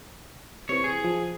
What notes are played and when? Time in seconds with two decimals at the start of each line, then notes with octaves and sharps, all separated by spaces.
0.69 C3 E3 C#5
0.84 G#4
1.04 F3